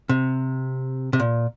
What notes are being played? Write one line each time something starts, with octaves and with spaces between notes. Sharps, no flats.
C3
C3
A#2